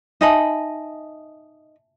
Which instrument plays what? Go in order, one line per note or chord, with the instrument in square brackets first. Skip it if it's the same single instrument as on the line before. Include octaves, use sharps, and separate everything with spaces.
[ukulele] D#4 D#5 B5 [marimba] E5 G#5 A5